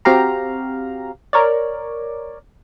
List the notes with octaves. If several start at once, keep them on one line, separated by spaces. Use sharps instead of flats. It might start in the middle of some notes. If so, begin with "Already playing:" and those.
C4 F#4 G4 F5 A#5
A#4 C#5 D5